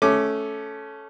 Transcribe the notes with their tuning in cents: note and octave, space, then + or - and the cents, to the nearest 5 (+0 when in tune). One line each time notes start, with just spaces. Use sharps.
A3 -15 C#4 +0 D6 +0